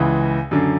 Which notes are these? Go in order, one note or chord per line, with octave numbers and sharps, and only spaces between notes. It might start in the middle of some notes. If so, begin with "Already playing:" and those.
Already playing: C#2 C#3 E3
F#2 D3